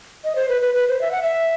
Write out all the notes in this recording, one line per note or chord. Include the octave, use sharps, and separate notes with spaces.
D#5
C5
B4
B4
B4
C5
E5
F#5
E5